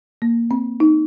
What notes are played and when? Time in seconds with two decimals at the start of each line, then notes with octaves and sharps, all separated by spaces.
0.22 A#3
0.51 C4
0.80 D#4